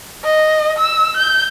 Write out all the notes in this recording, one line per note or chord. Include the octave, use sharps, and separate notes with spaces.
D#5
E6
G6